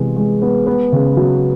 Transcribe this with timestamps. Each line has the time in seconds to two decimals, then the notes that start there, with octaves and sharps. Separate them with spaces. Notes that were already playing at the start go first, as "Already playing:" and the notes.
Already playing: C3 E3 G#3 B3
0.16 G#3
0.42 B3
0.67 B3
0.92 C#3
1.17 F#3